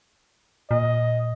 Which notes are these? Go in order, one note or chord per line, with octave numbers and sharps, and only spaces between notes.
A#2 D#5